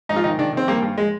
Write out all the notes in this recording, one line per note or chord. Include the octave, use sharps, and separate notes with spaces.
G#2 D#4
F4
D#3 D#4
D#3 D4
D#3 C4
G2 A#3
G2
G#3